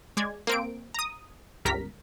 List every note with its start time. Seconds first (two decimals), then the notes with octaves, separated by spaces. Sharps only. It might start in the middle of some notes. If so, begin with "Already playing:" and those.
0.17 G#3 D5 G#6
0.47 A#3 C4 D7
0.94 A#5 D#6
1.65 G1 C#2 G3 A#4 A#5 B6